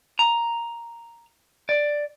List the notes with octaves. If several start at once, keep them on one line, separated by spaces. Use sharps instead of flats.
A#5
D5